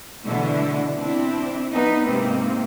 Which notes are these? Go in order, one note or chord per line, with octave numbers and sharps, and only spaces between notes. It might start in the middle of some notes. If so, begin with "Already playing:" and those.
B2 D3 E3 A3 D4 E4
C4 D4 E4
B3 D#4 B4
G#2 C3 A#3 C4